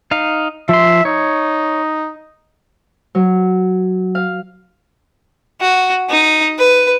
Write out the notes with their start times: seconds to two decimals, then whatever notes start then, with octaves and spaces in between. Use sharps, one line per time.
0.11 D#4 F5
0.69 F3 E5 C6
1.05 D#4 C#5
3.15 F#3
4.15 F5
5.61 F#4
6.10 D#4
6.59 B4